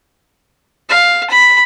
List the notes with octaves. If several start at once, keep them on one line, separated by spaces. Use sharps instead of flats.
F5
B5